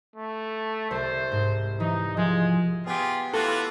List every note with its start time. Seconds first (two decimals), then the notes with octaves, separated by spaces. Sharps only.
0.16 A3
0.91 C2 C5 A5
1.32 G#2
1.80 E3 D#4
2.17 F3 G#3
2.87 B3 F4 G4 G#4
3.34 E3 F4 F#4 A4 B4